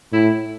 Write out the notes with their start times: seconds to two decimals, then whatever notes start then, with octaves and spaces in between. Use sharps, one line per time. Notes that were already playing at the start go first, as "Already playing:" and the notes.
0.13 A2 E4